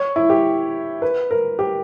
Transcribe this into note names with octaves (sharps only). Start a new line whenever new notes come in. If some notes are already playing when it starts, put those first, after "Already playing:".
Already playing: C#5
E4
G4
B4
A#4
G4